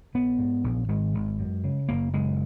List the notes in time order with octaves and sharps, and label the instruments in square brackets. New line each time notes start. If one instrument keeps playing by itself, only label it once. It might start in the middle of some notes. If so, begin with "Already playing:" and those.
[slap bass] A#1 B3
G#2
A#1
G#1 G#3
G#1
F#2
C#3
F#1 A#3
F#1 G#3